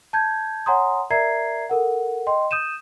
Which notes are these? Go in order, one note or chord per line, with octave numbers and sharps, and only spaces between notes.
A5 G6 G#6
C#5 F#5 G#5 A#5 C6 D#6
A#4 D5 E5 A#5 G#6 C7
A4 A#4 F#5
D#5 G5 C6
D#6 G6 D#7 E7